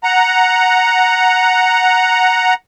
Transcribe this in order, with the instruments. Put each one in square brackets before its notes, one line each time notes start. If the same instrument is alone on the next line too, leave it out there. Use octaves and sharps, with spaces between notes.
[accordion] F#5 A#5